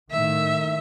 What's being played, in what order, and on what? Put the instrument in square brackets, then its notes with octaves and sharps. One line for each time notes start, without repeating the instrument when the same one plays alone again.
[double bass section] A2 D#3 A#3 [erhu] E5